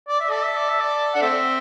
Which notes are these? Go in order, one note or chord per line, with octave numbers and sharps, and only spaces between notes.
D5
E5
A4 D5
E5
D5
E5
D5
D4 F#5
A3 C4 E5